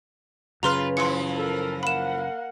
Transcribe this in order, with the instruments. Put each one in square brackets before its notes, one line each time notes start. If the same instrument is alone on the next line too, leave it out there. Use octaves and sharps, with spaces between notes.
[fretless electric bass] F#2 C#3 [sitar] F4 B4 [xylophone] A#5 C6 F6
[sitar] E3 F3 E4 [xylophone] C6 C#7
[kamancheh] A4 A#4
[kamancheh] A#3 F#5 [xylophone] B5 E7